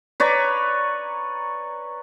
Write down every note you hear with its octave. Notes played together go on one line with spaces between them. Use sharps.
B4 C#5 D5 A#5